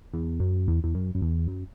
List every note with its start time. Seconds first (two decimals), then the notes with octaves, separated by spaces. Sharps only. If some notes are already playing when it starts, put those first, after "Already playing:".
0.14 E2
0.40 F#2
0.68 E2
0.84 E2
0.95 F#2
1.15 F#2
1.22 E2
1.48 F#2